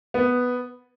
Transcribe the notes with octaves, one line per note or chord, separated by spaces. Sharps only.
B3